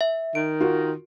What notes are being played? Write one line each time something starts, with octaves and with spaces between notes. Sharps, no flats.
E5
D#3 D7
F4 F#4 A#4